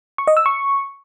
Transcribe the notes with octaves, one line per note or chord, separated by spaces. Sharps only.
C#6
D#5
E6
C#6